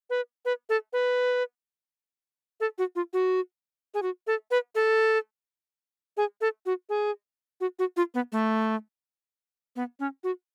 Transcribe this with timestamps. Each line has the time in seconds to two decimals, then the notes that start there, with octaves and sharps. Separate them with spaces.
0.10 B4
0.45 B4
0.69 A4
0.93 B4
2.60 A4
2.78 F#4
2.96 F4
3.13 F#4
3.94 G#4
4.02 F#4
4.27 A4
4.51 B4
4.75 A4
6.17 G#4
6.41 A4
6.66 F#4
6.89 G#4
7.61 F#4
7.79 F#4
7.97 F4
8.14 B3
8.32 A3
9.76 B3
10.00 C#4
10.24 F#4